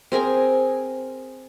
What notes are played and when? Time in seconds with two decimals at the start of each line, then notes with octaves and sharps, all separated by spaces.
0.12 C4 G#4 A#4 G#5